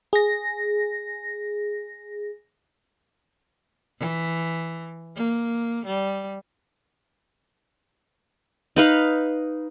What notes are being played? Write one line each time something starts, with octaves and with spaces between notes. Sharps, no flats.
G#4 A#6
E3
A#3
G3
D#4 B4 F5